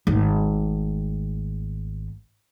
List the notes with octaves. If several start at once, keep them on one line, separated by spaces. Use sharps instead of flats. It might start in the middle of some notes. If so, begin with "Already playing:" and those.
G#1 A3